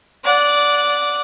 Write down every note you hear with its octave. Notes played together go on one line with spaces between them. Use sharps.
D5 F#5